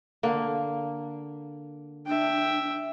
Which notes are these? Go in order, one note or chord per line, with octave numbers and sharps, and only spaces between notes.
D3 A#3
D4 E5 G5